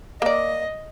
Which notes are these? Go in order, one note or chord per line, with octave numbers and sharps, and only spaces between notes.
A#3 D5 D#5